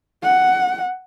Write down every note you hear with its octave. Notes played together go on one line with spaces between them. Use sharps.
F#5